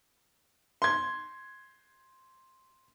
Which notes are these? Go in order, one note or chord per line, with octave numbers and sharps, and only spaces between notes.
C6 G#6